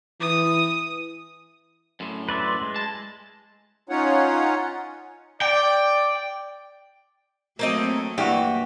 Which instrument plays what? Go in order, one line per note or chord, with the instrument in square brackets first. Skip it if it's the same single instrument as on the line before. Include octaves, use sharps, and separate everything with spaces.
[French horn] E3 [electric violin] D#6
[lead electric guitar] F#2 A2 [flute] C6
[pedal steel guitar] B4 D5 E5
G#3
[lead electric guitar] A5
[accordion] C#4 D#4 F4 C#5 F#5
[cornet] D5 [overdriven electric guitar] G5
[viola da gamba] F#3 A3 [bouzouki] A#3 C4 D#5
[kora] G2 E3 F#4 [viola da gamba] A#3 [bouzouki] G4